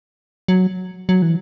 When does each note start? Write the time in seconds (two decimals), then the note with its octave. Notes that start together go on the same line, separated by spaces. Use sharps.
0.48 F#3
1.09 F#3
1.22 E3